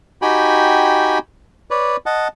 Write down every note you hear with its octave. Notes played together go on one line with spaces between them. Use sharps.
D#4 F#4 G4 G5 G#5 B5
B4 C#5 D5
D#5 F#5 A5